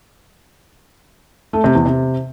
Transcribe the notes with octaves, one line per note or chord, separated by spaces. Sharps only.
A3
C3
E2
C3